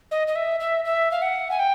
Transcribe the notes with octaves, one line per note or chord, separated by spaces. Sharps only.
D#5
D#5
E5
E5
E5
F5
F#5
G#5
G5